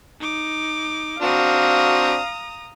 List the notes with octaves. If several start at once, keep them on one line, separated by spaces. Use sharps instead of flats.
D#4 D6
C4 D4 F#4 F5 A#5 D#6